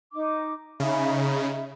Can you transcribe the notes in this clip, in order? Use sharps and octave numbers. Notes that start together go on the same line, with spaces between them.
D#4 D6
C#3 D#4 E5 B5